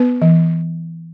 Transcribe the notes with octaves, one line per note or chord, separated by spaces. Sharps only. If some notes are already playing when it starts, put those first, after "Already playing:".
Already playing: B3 B4
E3